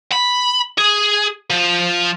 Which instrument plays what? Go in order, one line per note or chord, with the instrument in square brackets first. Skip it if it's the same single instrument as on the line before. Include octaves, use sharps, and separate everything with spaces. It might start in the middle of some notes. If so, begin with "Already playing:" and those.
[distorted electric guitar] B5
G#4
F3